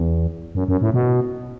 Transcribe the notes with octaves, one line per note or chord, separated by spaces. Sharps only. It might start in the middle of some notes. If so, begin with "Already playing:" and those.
Already playing: E2
F#2
F#2
A2
B2